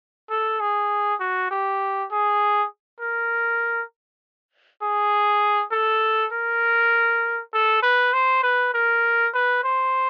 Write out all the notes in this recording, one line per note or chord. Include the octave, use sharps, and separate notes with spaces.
A4
G#4
F#4
G4
G#4
A#4
G#4
A4
A#4
A4
B4
C5
B4
A#4
B4
C5